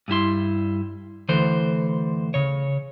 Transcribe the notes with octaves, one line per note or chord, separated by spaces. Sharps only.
G2 G3 E4 C6
D2 E3 A4 C5
C#3 C#5